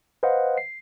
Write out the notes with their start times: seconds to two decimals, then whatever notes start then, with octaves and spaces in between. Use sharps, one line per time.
0.23 B4 C5 D#5 F5 F#5
0.58 C7